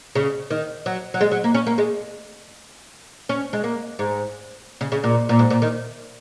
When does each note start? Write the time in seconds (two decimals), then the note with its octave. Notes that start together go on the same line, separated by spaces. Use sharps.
0.15 C#3
0.50 D#3
0.86 F#3
1.14 F#3
1.21 G#3
1.31 F#3
1.44 A#3
1.54 C#4
1.67 A#3
1.78 G#3
3.29 C#4
3.53 G#3
3.64 A#3
3.99 G#2
4.81 C#3
4.92 C#3
5.04 A#2
5.29 A#2
5.39 G#2
5.50 A#2
5.62 D#3